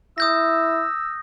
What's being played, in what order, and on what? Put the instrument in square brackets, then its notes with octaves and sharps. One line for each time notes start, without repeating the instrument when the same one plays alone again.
[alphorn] E4 [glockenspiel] D#6 G6 A#6 [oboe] E6